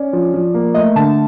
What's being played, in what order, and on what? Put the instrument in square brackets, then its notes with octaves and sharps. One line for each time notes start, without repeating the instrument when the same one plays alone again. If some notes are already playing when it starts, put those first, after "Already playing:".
Already playing: [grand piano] C#4 [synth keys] D5
[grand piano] F3
F3
A#3
[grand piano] A3 [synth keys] D#5
[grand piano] D3 [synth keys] A5